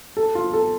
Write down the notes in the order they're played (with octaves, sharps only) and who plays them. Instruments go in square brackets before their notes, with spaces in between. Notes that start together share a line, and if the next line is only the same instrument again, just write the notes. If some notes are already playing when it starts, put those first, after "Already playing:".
[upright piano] A4
F4
A4